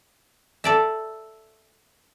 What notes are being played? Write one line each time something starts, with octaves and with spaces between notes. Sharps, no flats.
A4 D5 E5